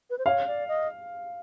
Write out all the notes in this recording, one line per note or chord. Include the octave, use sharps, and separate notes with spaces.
B4
C5
C#5 F5
D5
D#5